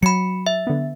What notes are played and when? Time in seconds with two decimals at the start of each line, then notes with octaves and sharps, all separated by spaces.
0.03 F#3 B5 C#7
0.47 E5
0.67 D3 B3